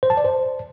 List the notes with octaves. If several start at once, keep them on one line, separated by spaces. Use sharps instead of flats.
C5
A5
D5
C5